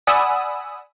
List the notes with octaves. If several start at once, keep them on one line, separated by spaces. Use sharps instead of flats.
D5 F#5 G#5 B5 D#6 E6